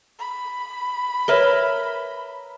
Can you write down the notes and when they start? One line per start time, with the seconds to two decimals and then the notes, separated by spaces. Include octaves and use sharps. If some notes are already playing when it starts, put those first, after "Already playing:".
0.19 B5
1.28 A#4 B4 C#5 E5 F6 G7